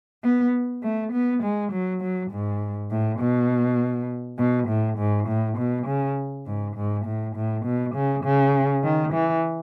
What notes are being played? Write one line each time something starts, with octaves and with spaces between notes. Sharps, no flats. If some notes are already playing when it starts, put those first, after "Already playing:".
B3
A3
B3
G#3
F#3
F#3
G#2
A2
B2
B2
A2
G#2
A2
B2
C#3
G#2
G#2
A2
A2
B2
C#3
C#3
D#3
E3